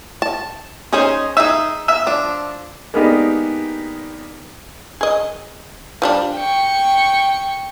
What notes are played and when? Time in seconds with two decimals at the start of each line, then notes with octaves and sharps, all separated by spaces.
0.22 A5
0.93 C#4 D#4 G#4 C5
1.37 D#4 G#4 E5
1.88 E5
2.06 F3 D4
2.94 G#3 A#3 B3 D4 D#4 G4
5.01 G#4 D#5
6.02 F3 G3 D4
6.36 G5 C#6